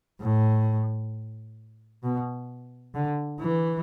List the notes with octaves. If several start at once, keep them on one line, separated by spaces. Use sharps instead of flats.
A2
B2
D3
E3